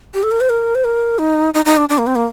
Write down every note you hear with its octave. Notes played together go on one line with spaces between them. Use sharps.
G4
A4
A#4
C5
A#4
C5
A#4
D#4
D#4
D#4
D4
D4
A#3
C4
A#3